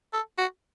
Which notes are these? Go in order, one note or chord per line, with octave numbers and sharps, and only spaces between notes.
A4
F#4